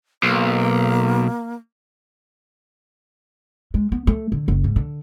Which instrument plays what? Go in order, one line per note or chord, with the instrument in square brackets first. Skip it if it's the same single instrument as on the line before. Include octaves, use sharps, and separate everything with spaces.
[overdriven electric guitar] B1 [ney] A#3
[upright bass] G#3
B3
A3
D3
F#1
G#2
D3